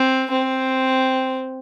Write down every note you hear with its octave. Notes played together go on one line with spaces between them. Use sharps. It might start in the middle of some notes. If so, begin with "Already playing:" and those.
Already playing: C4
C4